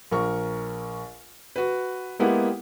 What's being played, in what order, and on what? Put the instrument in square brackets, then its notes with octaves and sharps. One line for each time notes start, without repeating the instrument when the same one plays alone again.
[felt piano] A#1 A#4 C#6
F#4 B4
G#3 A#3 B3 E4 G4 F#5